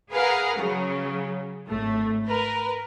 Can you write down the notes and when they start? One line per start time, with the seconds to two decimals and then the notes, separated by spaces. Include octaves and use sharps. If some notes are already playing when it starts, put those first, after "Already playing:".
0.11 G#4 A#4 B4 F5 F#5
0.57 C#3 F#3
1.67 G#1 A2 A3
2.27 A#4 B4